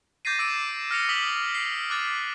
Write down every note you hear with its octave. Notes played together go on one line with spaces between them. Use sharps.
D6 G6 A6 A#6 C7 D#7
D6 E6 C7 D7
F6 A#6 C7 C#7 F7
D#6 B6 F#7 G7
C7 D7
D6 F#6 A6